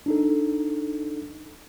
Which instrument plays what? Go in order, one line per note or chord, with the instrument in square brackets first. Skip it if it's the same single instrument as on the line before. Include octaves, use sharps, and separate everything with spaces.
[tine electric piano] D4 D#4 A4